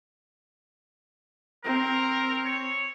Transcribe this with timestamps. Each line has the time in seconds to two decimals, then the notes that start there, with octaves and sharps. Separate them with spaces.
1.64 C4 A#4
2.46 C#5